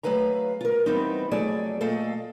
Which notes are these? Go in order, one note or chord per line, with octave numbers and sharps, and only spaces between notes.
F#3 A3 G#4 B4 F5 A#5
F4 A#4
E3 G3 B3 C4 D#4
F2 F#3 A3 G#4 A4 D5
A#2 A3 A4 D#5 F5